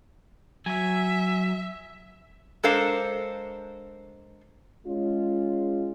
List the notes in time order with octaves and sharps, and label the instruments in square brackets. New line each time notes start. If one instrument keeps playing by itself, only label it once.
[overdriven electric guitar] F#3 [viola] E5 [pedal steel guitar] G#5
[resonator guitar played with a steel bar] G#3 D4 A4 A#4 C5 F5
[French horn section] G#3 C#4 F4